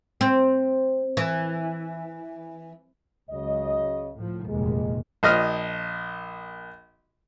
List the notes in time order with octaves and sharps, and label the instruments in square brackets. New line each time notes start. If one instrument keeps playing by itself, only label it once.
[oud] C4
E3
[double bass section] C#2 [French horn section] C#3 F#3 D#5
[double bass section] A2 F3
[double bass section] F1 D#2 A#2 [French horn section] G#3
[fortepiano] A#1 D#5 F6